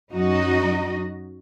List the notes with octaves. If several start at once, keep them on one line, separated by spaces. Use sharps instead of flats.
F#2 D#4 F#4 D#5